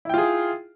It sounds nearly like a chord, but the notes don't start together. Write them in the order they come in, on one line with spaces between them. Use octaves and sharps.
E4 G5 F4 G#4